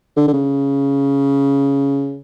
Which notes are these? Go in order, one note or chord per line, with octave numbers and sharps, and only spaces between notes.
D3
D3
C#3